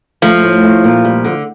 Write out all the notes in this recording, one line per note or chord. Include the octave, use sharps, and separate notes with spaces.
F3 A3
A2
A3
A#2
G3
D3